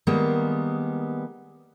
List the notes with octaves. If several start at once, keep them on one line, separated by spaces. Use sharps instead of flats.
D#3 G3 G#3 A#3 B3